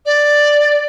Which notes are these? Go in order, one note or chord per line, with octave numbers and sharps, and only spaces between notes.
D5